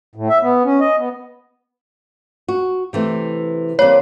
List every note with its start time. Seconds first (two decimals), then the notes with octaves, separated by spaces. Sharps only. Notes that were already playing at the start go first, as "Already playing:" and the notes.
0.15 A2
0.29 E5
0.42 B3
0.65 C#4
0.80 D#5
0.98 B3
2.48 F#4
2.93 C3 E3 A3
3.79 C3 G3 A#3 C#5